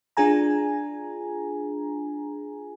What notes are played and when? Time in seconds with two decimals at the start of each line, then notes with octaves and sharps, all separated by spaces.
0.17 D4 F4 G#4 G#5 A#5